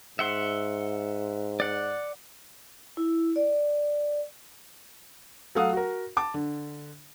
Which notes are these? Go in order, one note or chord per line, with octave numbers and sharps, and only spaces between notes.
G#2 E5 F#5 C6
D5 F#5
E4
D5
F#3 A3 A4 F5 F#5 D#6
F#4 A#4
A5 D6
D3